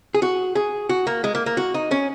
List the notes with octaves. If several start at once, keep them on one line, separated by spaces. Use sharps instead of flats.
G#4
F#4
G#4
F#4
A#3
G#3
A#3
A#3
F#4
D#4
C#4